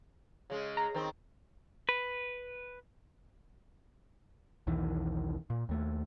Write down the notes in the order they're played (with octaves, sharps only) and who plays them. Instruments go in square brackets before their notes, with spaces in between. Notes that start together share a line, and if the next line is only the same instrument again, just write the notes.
[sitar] C#3 G#3
[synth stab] A#5
[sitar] D#3 C4
[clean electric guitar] B4
[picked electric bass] B1 E2 D#3 E3
A#2
D#2 A3